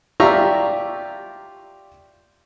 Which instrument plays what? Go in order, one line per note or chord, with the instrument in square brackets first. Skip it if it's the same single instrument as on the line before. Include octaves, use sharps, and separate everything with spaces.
[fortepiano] F4 G4 D5 E5 A#5 C#6